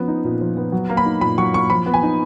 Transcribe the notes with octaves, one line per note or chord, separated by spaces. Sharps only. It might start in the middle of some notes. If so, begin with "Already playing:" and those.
Already playing: F3 B3 C#4
D#4
A#2
F3
B3
F#3
A#3
B5
D#4
A#2 B5
F#3 C#6
A#3 C#6
F3 B5
B3
G#5
D#4